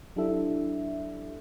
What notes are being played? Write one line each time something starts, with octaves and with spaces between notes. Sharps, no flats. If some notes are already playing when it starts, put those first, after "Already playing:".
F#3 D4 E4 G4 A4 E5